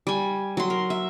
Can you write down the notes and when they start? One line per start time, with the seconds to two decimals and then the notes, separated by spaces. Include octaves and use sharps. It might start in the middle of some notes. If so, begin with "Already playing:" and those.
0.07 G3 G#5
0.57 F#3 C6
0.70 A#4
0.90 E5